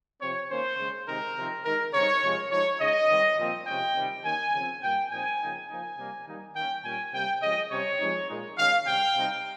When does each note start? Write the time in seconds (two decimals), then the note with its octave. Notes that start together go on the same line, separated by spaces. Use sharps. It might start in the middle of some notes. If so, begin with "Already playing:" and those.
0.21 C3 F3 C4 C#5
0.50 D#3 A#3 C#4 C5
0.78 C#3 G#3 C#4
1.07 C3 D#3 G#3 C4 D#4 A#4
1.37 C3 F3 C4 D#4
1.65 D#3 G#3 D#4 A#4
1.94 C#3 G3 C4 D#4 C#5
2.23 C3 F3 G#3
2.51 F3 G#3 D#4 C#5
2.80 C#3 G#3 D#4 D#5
3.10 D#3 G3 C4
3.39 A#2 F3 C4
3.67 C3 F3 G#3 C#4 G5
3.96 C3 D#3 G3
4.24 D#3 A#3 C#4 G#5
4.54 C#3 F3 C4
4.83 A#2 G3 A#3 G5
5.12 A#2 F3 C4 D#4 G#5
5.40 C#3 F3 A#3 D#4
5.69 F3 A#3 D#4 G#5
5.98 C3 G3 A#3
6.26 D#3 G3 A#3 D#4
6.55 D#3 A#3 C#4 G5
6.84 A#2 G3 C#4 G#5
7.13 C3 G3 A#3 G5
7.42 C#3 F3 G#3 C#4 D#5
7.71 C3 G3 C#4 C#5
7.99 F3 G#3 C4 D#4
8.29 A#2 G#3 D#4
8.58 D#3 G#3 C#4 F5
8.86 C3 G3 C#4 G5
9.16 C3 G3 C4 D#4